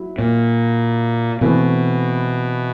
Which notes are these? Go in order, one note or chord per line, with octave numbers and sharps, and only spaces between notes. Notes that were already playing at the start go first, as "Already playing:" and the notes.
Already playing: F#3 E4
A#2
B2 E3 A3 C4 E4